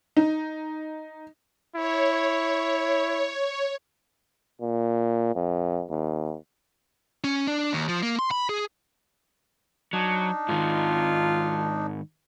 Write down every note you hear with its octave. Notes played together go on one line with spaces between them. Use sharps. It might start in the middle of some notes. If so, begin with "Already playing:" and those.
D#4
E4 C#5
A#2
F2
D#2
C#4
D4
D#2
F3
A#3
C6
B5
G#4
F#3 D4 D#4
G#2 D#3 F4